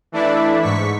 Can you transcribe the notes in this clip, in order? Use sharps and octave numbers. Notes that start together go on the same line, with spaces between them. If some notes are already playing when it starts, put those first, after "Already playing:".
E3 A3 D4 E4 D5 E5
G#2 C#6 B6